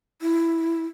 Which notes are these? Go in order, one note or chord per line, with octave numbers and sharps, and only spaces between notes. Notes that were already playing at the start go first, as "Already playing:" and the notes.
E4